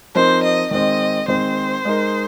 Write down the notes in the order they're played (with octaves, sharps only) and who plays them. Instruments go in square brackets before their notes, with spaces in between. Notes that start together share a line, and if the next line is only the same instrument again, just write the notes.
[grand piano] F3 C4 D#4 A#4 [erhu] C5
[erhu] D#5
[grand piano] D#3 G#3 C4 [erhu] D#5
[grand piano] D#3 G#3 C4 [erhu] C5
[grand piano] G#3 D#4 A#4